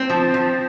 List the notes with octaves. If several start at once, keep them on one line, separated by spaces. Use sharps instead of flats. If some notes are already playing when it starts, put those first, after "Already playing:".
Already playing: C4
F3
F3